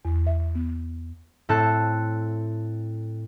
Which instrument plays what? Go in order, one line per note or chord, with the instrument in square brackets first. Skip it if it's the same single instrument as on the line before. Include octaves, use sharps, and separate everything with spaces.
[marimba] E2
E5
B3
[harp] A2 C4 A4 A5 F#6